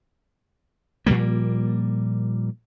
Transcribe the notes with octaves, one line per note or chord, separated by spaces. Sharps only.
A#2 F3 G3 A#3